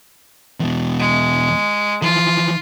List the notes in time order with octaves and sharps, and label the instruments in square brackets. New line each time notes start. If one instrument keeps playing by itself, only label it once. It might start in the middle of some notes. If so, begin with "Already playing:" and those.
[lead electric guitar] E2 B2
[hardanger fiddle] G#3
[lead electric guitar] E3 F3 [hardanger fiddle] F4